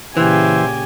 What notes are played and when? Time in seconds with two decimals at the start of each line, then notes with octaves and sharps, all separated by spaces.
0.17 A#2 C#3 E3 G4 C5 E5 G#5